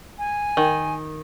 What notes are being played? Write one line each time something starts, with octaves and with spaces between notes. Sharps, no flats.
G#5
D#3